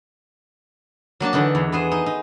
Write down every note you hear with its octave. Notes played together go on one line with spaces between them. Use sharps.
F#3 A#3 D4 A5
D3 E3 D4 D#4
E2
B3 G#4 C5
D#4
D#4